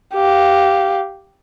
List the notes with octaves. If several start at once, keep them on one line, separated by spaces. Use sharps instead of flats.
G4 F5